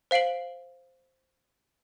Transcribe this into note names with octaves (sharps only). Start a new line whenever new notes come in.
C5 F5 C7 D7 F#7